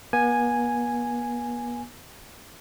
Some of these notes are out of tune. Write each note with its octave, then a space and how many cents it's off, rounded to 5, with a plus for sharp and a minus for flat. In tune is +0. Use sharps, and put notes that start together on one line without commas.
B3 -45 G#5 +0